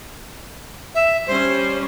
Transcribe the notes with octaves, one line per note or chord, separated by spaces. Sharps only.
E5
G3 C#4 C5